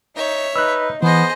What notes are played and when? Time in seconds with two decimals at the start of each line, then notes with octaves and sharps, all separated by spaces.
0.16 D#4 C#5 E5
0.56 D#4 B4 E6 F#6
1.03 E3 B3 G#4 C5 D#5